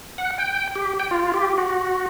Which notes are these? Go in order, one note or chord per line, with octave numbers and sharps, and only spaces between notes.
F#5
G5
G4
G5
F4
G4
F#4